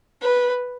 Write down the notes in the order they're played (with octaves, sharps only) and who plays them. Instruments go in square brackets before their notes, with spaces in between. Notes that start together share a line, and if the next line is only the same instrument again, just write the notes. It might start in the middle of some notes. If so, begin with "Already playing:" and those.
[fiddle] B4